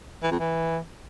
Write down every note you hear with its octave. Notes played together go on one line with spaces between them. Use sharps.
E3
F2
E3